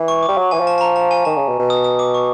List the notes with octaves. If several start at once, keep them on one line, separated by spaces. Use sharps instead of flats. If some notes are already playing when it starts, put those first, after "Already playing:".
Already playing: E3
C#6
D6
G3
F#3
E3 G#5
F3
A5
A5
A#5
A5
G#5
D#3 A5
C#3
B2
B2
D#6
D#6
D6
C#6